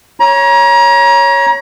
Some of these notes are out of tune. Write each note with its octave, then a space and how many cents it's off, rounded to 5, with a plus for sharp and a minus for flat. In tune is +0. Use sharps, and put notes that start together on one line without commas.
C#5 +0 A#5 +35